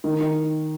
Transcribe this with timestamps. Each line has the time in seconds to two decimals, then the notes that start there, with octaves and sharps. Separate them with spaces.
0.04 D#3
0.21 D#3